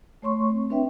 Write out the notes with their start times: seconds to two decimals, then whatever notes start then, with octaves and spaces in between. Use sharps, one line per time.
0.22 A3 C#5 C6 C#6
0.50 C4
0.70 C4 D4 B4 E5 G5